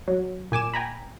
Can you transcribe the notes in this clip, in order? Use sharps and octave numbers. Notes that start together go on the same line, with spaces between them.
F#3
A#2 G#5 D6 E7
G5 G#5 A#5 B5